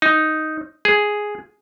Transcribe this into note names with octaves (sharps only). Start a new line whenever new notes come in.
D#4
G#4